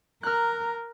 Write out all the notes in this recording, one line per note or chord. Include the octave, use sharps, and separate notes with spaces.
A#4 A#5 F6 F#6